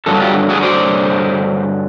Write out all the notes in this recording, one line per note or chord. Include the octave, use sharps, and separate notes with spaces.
G2 D3 F#3 A4
F4 G4
F#4 G#4
C5 D5